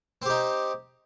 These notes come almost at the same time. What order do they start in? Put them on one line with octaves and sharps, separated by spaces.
C4 G4 D#4